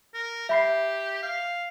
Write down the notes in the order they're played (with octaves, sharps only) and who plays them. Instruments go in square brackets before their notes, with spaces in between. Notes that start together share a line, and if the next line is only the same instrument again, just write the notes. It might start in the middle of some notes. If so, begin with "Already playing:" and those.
[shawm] A#4
[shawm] G4 [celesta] E5 B5 C7
[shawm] F5